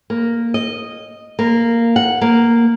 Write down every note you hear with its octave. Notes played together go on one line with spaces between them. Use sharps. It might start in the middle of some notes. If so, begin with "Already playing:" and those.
A#3
D#5
A#3
F#5
A#3